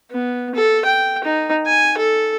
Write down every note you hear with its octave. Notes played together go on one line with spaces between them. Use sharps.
B3
A4
G5
D#4
G#5
A4